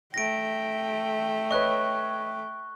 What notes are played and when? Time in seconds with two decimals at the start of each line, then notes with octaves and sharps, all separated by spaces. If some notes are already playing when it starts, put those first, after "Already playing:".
0.14 A3 G5 A#6 D7
1.51 B4 C#5 D#5 C#6 F#6